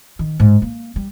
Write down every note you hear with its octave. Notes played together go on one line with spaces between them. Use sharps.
D#3
G#2
A#3
G3